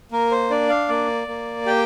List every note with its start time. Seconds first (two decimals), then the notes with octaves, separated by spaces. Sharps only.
0.12 A#3 A#4
0.31 C5
0.50 D4 D5
0.70 F5
0.89 A#3 D5
1.28 A#3
1.66 G4 G5